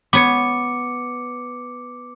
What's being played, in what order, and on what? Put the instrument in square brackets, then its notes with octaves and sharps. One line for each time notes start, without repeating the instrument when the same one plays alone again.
[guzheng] B3 C#5 [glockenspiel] D6 C#7